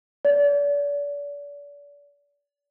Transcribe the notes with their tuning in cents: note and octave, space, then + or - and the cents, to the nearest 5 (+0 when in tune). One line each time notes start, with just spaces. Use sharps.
D5 -35